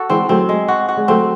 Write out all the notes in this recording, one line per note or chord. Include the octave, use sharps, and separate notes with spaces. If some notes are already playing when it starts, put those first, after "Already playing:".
Already playing: F#4 A4
E3 G#3 C4
F#3 A3 C4
G#3
F#4
F#4
G#3
F#3 A3 C4